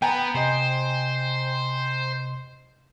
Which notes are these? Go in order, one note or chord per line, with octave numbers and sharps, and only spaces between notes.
B3 G5 G#5 A#5
C3 C5 D#5